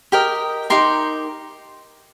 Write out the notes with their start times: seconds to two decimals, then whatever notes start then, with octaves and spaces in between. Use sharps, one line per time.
0.12 G4 A#4 D#5 G5
0.70 D#4 G4 A#4 C6